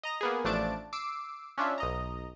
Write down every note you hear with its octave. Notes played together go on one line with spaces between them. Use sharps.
D#5 A#5 A#6
A#3 B3 G#4
A1 F3 A3 D4 A5 D7
D6 E6 C7 D7
C#4 D4 F4 E5
B1 D#5 A#5